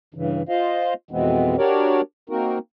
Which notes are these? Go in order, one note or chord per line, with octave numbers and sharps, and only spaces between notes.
G2 C#3 E3
F4 C5 D#5 F5
F2 B2 E3 G#3 B3 C4
D4 F#4 G4 A#4 C#5 D5
A#3 C4 D#4 F#4 A#4